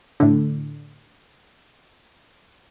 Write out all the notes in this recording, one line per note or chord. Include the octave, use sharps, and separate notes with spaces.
A2 D3